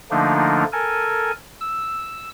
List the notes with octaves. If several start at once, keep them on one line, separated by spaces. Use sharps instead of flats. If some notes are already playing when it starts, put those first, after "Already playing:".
D3 F3 A3 A#3 D4 D#4
A4 A#4 G#5
E6